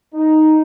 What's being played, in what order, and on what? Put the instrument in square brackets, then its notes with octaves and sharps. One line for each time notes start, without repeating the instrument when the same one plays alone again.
[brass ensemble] D#4